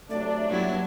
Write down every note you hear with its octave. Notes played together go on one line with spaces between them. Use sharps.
C3 F#3 A3 D4 D5
G2 F#3 A#3 E4